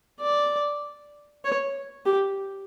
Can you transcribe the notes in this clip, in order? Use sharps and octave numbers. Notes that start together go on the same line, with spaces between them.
D5
C#5
G4